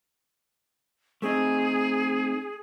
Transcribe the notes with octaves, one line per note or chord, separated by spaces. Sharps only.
A3 C4 D#4 G#4